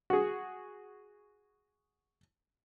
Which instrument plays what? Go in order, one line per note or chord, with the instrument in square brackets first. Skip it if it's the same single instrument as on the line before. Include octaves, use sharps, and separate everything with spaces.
[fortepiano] F#4 G#4